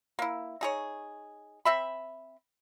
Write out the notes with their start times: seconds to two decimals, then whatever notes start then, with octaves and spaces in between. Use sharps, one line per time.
0.19 A#3 E4
0.61 D#4 G#4 C#5
1.65 C4 E5 B5